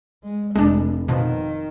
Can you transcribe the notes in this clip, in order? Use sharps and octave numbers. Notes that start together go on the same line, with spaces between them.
G#3
F1 G#3 D4
B2 D#3 F3